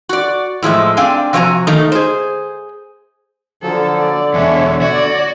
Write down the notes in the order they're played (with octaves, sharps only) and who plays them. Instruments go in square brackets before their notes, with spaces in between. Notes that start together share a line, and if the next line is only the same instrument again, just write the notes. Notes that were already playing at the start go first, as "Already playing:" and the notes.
[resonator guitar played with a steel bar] F#4 D5
A2 F3 G#3 E5
C4 D4 F5 G5 G#5
C3 F3 F#4 D5 G#5 A#5
D#3 A3 A#3 D#4
G#4 C5
[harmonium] D3 [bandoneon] F3 F#3 [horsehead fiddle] A4
[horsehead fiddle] D5
[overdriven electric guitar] E2 B2 [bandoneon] G#3 D4 [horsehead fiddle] C#5 E5
[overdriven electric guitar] F#4 [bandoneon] C#5 [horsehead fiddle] D5